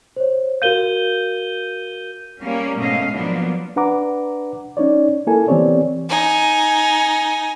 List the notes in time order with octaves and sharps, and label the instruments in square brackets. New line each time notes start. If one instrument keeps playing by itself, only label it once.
[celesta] C5 C#5
[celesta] F#4 A#4 F5 [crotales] G6 D#7 G7
[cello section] G3 A#3 C#4
G#2 B2 A3 C#4 D#5 F5
F3 F#3 A#3 B3 D4
[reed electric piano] D4 B4 F#5 A#5 D6
C#4 D#4 C#5 D5
A#3 E4 A4 A#4 G#5
E3 B3 C4 G4 C#5 D5
[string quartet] D#4 G#5